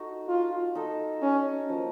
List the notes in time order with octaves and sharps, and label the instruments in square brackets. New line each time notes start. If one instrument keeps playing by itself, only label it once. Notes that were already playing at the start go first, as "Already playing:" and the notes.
Already playing: [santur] D#4 F#4 A4
[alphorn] F4
[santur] D#4 A4 D#5
[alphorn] C#4
[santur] F3 A#3 D#4